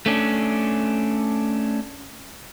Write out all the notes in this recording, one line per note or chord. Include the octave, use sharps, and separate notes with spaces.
A3 C#4 D4